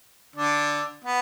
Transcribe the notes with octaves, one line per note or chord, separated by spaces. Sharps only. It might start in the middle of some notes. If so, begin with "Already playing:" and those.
D3 D4
B3